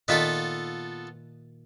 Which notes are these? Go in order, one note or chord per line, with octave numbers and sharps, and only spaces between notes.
A#2 D#3 B3 F4 A4 E5